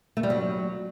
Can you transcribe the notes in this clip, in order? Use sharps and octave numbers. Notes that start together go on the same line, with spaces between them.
A3
G3
F#3